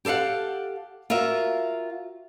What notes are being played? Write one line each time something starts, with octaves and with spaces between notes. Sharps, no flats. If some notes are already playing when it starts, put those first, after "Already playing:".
G4 A4 C5 F5 F#5
F4 F#4 A#4 E5 F5